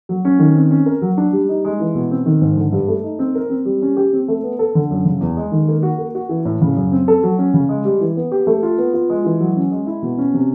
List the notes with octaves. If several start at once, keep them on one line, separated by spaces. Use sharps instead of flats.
F#3
C#4
D#3
C4
C#4
A#4
F#3
D4
G3
D#4
G#3
E3
B2
C4
D#3
G#2
D3
G2
A3
D#4
C4
A#4
C4
G3
C#4
G4
C4
A3
B3
A4
D3
F#2
C#3
E2
G#3
D#3
A#3
F#4
A#3
F#4
E3
A2
C#3
F#2
C4
A4
F#3
C#4
C#3
G#3
G3
E3
B3
G4
A3
F4
B3
F4
G#3
E3
F#3
C#4
G#3
E4
B2
C#4
C3